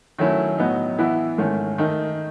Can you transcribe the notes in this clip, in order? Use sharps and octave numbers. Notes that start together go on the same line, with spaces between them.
D#3 F#3 A3 C#4 E4
A2 F#3 B3 D#4
E3 B3 E4
G#2 D#3 A3 C#4
D#3 A3 D#4